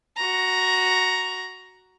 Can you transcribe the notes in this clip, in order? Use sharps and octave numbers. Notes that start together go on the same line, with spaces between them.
F#4 A#5